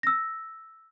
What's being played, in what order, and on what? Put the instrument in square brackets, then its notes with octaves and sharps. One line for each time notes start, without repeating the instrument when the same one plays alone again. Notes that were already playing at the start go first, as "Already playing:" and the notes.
[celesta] E6 A#6